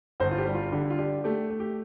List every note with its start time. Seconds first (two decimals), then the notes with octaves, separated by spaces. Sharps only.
0.20 G1 C5
0.31 F4
0.38 G4
0.46 G3
0.54 F4
0.72 D3 G4
0.90 F4
0.98 D4 G4
1.24 A3 G4
1.50 A3
1.60 G4